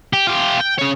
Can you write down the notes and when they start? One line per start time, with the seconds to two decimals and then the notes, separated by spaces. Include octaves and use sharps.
0.13 G4
0.27 F4 G4
0.60 G5
0.79 C#3 C#5